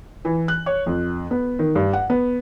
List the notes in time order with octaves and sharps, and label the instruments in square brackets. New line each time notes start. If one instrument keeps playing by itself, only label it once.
[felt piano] E3
F#6
C#5
F2
B3
D#3
G2
F#5
B3